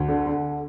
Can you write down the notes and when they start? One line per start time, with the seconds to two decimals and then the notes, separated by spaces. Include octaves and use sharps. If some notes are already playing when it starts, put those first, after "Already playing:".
Already playing: D2
0.08 D3
0.26 D3